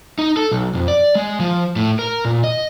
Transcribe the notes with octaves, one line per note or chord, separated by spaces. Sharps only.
D#4
A4
B1
F2
D5
G#3
F3
A2
A#4
A#2
D#5